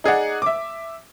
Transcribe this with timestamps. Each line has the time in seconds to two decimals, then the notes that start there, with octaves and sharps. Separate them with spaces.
0.04 D#4 G#4 D5 F#5
0.42 E5 D6